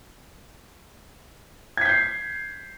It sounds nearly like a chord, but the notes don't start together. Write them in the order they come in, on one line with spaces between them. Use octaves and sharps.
G#6 B6 G6 C7